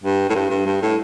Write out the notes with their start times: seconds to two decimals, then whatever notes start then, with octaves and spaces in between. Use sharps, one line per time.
0.04 G2
0.30 A2
0.35 G2
0.50 G2
0.66 G2
0.82 A2